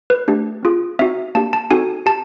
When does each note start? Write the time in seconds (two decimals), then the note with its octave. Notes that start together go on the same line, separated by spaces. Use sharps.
0.10 B4
0.28 A3 D4 G4
0.63 C4 F4 G#4
0.99 C4 D#4 F#4 E5
1.35 A#3 D4 G4 A5
1.53 A5
1.71 C4 D#4 F#4 A4 G#5
2.06 G4 A5